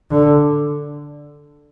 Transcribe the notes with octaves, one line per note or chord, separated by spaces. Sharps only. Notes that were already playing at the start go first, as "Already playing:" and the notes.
D3